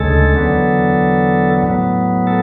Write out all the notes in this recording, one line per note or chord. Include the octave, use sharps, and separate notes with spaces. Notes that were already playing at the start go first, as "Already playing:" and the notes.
Already playing: D2 C#3 G#3 A4
E2 D3 F#3 B3
A2 F#3 B3
A4